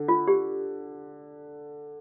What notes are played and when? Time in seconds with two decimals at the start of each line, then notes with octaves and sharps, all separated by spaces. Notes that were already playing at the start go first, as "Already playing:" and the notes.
Already playing: D3
0.08 F4
0.28 G4